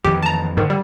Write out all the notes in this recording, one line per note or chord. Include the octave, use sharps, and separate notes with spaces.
F2 D#3 E3 G4
A5 A#5
G#2 D3 D#3
G3